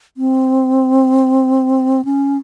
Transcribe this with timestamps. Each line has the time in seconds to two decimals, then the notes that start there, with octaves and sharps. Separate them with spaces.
0.17 C4
2.05 C#4